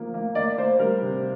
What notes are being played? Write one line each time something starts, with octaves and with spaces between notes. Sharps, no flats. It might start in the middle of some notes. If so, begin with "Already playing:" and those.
Already playing: F3 A#3
A#3
A#3 D5
A#3 C5
G3 A#4
C3